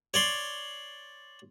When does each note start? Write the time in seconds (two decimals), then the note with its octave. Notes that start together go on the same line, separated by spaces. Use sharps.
0.14 C#5 D5 C6